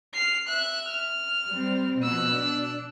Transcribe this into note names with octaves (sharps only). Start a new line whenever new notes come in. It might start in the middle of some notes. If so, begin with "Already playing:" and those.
F6 C7
E5 F#6
F6
G3 C4
B2 F3 E6 F#6
D4